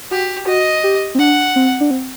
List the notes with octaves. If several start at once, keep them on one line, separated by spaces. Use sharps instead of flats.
F#4 G4
F#4 D#5
G4
C4
D4 F#5
C4
D4
C4